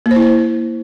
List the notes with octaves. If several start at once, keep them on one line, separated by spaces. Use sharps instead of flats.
A#3
C5
E4